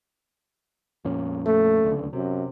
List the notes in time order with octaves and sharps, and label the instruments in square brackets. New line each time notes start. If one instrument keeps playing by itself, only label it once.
[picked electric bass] F2 A#2 C#4
[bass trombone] A3
[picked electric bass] D1 C#2 D3
[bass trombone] F#2 [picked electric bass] C3